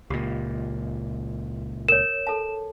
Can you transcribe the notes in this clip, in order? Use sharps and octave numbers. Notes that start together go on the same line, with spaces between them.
C#2 A#2 G4
A#4 C#5 E7
A4 A5